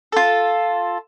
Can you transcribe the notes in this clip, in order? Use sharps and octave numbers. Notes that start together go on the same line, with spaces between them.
F4 A4